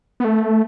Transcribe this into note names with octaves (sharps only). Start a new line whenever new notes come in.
B3
A3